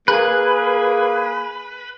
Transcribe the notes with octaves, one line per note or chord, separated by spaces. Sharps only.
A#3 G#4 B4